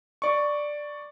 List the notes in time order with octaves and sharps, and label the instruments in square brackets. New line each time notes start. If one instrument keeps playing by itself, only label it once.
[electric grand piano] D5 C#6